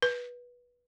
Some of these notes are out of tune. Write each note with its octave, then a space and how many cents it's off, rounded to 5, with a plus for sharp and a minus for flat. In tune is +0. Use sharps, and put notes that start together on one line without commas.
B4 -20